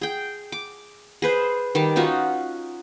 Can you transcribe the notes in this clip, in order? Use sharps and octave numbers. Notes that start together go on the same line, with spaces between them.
G#4 G5
D6
G#4 B4 C5
D#3 G3 A5
C#4 D#4 F4 F#4